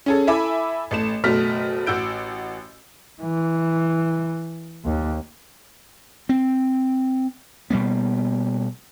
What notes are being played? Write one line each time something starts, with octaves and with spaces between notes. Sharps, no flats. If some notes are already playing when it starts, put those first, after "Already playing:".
C#4 G#4 A4
E4 A4 E5 G#5 B5 D6
A1 A3 E7
F#1 B2 F#3 A3 F6 B6
A1 F#4 E6 G6 D7
E3
D#2
C4
B2 G3 A#3 B3